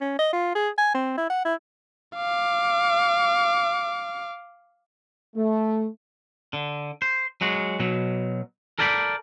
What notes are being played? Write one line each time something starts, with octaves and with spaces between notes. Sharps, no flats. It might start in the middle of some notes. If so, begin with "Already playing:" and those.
C#4
D#5
F4
G#4
G#5
C4
E4
F#5
E4
F5 D6
A3
D3
C5
F#3 G#3 F#4
B2 F#3
A4 A#4 D5 G5 G#5 B5